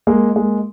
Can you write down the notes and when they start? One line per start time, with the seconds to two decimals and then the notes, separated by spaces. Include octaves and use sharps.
0.07 G#3 A#3
0.36 G#3 A#3